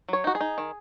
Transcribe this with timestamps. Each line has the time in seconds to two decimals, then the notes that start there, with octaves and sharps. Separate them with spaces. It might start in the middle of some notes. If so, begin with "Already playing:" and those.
0.09 F#3 C#5
0.24 D#4 F#4
0.35 G#4
0.41 D#4
0.58 D#3